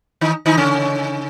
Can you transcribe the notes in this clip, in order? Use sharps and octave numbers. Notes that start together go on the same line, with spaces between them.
D#3 D#4
D#3 D#4
C#3 C#4